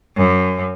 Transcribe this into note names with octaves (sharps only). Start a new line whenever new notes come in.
F#2